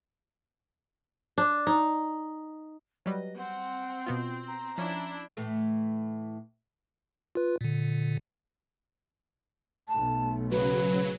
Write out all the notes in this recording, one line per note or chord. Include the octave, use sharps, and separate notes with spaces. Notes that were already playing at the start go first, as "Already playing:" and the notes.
D4
D#4
F#3 G3 B4 D#5
C4 F#5
B2 B3 F4
A#5
F3 C#4 D4 E4
A2 E3 A3
F4 B4
A#2 D3
B1 A3 A5
C#3 F#3 B4